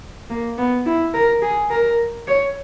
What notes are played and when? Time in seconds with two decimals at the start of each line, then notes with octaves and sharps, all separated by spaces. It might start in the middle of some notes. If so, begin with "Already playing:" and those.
0.30 A#3
0.58 B3
0.86 E4
1.14 A#4
1.42 G#4
1.71 A#4
2.27 C#5